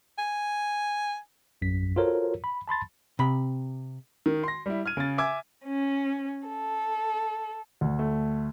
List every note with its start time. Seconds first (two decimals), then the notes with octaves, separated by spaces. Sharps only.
0.18 G#5
1.62 A#1 F#2 B6
1.96 F4 F#4 A4 A#4 C5 C#5
2.44 B5
2.68 A5 B5 C6 A6
3.19 C3 B5
4.26 D#3
4.44 C6 A#6
4.66 G3 E4
4.86 F6 G#6 D#7
4.97 C#3 A6
5.18 E5 G#5 D6 E6 G#6
5.65 C#4
6.48 A4
7.81 D2
7.99 A3